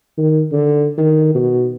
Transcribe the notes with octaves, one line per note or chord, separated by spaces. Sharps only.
D#3
D3
D#3
B2